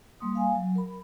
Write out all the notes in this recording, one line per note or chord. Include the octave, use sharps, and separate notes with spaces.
G3 A#3 C6 D#6
F5 G#5
F#3
A#4 B5